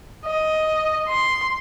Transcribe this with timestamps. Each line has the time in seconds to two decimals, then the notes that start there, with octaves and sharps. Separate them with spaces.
0.26 D#5
1.09 C6